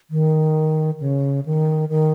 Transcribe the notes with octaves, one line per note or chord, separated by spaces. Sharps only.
D#3
C#3
D#3
D#3